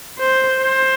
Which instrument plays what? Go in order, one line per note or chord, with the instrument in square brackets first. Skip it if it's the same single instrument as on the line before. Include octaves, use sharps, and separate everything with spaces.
[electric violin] C5
C5